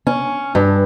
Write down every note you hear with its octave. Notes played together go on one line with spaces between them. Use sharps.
C#4
G2